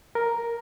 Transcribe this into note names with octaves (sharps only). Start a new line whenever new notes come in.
A#4